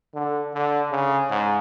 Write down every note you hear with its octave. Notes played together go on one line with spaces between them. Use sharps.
D3
D3
C#3
G#2